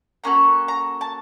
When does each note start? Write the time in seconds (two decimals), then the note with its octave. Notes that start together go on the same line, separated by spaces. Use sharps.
0.24 A#3 C#4 F#4 A4 A#5
0.68 A#5
1.01 A5